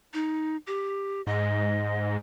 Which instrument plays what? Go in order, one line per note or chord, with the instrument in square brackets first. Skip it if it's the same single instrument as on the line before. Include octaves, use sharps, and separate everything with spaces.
[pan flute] D#4
G4
[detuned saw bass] G#2 [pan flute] D#5